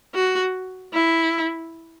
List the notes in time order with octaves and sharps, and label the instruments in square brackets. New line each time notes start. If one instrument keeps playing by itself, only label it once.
[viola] F#4
E4